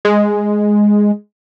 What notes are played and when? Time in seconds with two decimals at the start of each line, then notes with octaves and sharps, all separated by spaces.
0.05 G#3